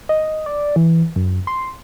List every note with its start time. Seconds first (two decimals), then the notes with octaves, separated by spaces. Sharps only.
0.09 D#5
0.46 D5
0.76 E3
1.16 F#2
1.47 C6